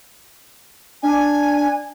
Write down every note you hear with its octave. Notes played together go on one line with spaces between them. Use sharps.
D4 G#5